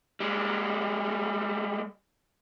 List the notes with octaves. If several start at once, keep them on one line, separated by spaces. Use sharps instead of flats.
G3 G#3